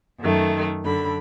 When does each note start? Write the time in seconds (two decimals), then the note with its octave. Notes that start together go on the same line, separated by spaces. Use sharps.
0.19 F#2 D#3 A3
0.83 F#2 D3 D4 B5